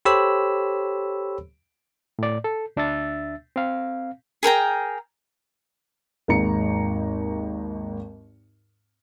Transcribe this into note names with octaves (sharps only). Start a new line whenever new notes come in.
G4 A4 C5 C#5 B5 E6
A2 D5
A4
D2 D4 E5 E6 A6
C4 F5
G#4 A#4 G5 A#5
G#1 D#2 G#2 A#5 C#7